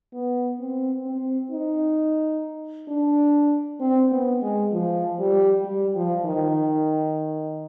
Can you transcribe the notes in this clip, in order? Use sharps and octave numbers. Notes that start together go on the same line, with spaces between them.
B3
C4
C4
D#4
D4
C4
B3
G#3
F3
G3
G3
F3
D#3